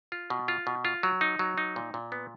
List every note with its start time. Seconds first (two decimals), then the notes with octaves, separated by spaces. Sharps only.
0.12 F4
0.30 B2
0.48 F4
0.67 B2
0.85 F4
1.03 F#3
1.21 D#4
1.39 F#3
1.58 D#4
1.76 A#2
1.94 A#2
2.12 B3